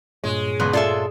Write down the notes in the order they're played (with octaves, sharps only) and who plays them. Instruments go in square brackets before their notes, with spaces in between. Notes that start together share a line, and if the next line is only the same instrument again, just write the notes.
[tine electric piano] G2 A#2 C#5 [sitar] G#3
[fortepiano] C#2 C6 F#6 [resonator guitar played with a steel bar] B3
[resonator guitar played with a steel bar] F4 A4 E5 [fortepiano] D5